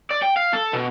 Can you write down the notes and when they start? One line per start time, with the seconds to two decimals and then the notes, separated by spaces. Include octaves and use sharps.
0.10 D5
0.22 G5
0.36 F5
0.53 A4
0.73 B2